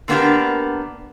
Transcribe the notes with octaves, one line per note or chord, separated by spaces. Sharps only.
D3 A#3 B3 D4 G4 A#4